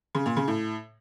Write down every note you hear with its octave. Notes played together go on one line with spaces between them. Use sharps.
C#3
A#2
C#3
A2